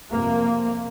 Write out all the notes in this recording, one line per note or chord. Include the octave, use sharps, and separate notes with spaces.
F2 C3 A#3